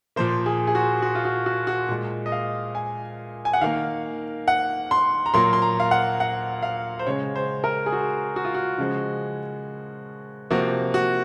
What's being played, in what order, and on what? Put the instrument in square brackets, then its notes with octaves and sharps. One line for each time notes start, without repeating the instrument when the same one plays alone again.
[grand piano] A#2 F3 A#3 C5
G#4
G#4
F#4
F#4
F4
F#4
F#4
F#4
A#2 G#3
D#5
F5
G#5
G#5
F#5
D#3 A#3 F5
F#5
C6
A#5
A#2 F#3 A#3 C6
C6
A#5
F5
F#5
F#5
F5
C5
C#3 G#3 C#5
C5
A#4
G#4
F#4
F#4
F4
F#4
C#3 F3 G#3
C3 F3 A#3 F#4
F#4